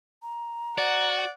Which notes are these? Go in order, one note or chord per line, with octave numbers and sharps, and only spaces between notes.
A#5
F#4 D5 F#5